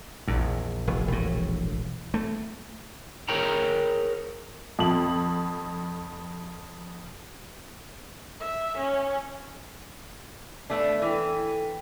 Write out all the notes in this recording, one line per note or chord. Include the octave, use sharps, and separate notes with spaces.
A#1 E2
F1
E1 A2
A3
G#4 A#4 C#5 G5 A#5
F2 F#7
E5
C#4
A3 B3 D4
E3 E4 A4 G5